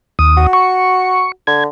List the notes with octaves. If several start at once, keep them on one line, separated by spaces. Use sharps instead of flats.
D#2 D#6
F#4
C#6
D3 G#6